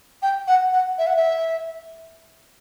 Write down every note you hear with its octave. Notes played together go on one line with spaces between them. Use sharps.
G5
F#5
F#5
E5
F#5
E5